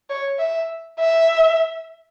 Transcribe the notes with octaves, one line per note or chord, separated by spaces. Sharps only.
C#5
E5
E5